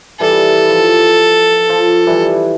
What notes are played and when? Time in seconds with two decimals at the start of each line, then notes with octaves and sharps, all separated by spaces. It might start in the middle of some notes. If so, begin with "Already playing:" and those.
0.20 E3 G3 A4
0.70 F3
1.69 F3
2.07 E3 G3